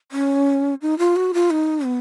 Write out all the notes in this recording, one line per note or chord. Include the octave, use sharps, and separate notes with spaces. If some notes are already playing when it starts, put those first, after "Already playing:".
C#4
D#4
F4
F#4
F4
D#4
B3